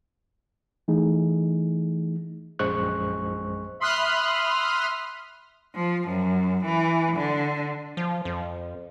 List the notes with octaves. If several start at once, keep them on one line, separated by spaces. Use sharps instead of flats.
E3 A3 D#4 G#4
A#1 F#2 G#3 C5 C#6 F#6
E5 B5 C6 D#6 F6 F#6
F3
F#2
E3
D3
F3
F2